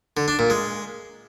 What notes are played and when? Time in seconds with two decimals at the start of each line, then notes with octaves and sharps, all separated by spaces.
0.17 D3
0.28 D4
0.39 A#2
0.50 G#3